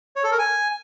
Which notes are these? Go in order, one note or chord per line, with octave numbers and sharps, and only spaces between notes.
C#5
A4
A#4
G#5